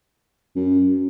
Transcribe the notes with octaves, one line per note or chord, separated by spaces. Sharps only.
F#2